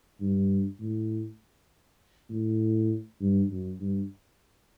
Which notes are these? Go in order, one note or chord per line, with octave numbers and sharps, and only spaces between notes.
G2
A2
A2
G2
F#2
G2